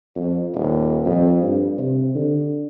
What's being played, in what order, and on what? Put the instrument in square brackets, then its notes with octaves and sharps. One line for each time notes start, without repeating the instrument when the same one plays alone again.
[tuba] F2
D#1
F2
G2
C3
D3